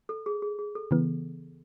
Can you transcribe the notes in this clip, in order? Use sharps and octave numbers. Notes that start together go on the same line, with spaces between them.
A4
G#4
G#4
G#4
A4
C#3 E3 B3